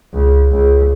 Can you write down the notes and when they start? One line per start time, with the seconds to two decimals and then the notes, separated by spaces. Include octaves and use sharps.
0.14 C#2
0.51 C#2